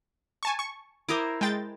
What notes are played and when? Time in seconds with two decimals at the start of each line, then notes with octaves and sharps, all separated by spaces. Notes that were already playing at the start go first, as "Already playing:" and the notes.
0.43 G#5 A5 C#6
0.59 C#6
1.09 E4 A#4 C5 D6 D#6
1.41 G#3 G5 A6